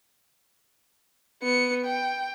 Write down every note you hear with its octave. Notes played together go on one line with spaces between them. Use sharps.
B3 C#7
G5